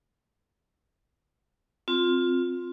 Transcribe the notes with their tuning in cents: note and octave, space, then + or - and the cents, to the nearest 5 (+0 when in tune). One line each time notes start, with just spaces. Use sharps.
C4 +0 F4 +15